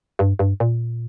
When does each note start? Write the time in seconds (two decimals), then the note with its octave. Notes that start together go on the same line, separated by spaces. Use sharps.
0.19 G2
0.39 G2
0.60 A#2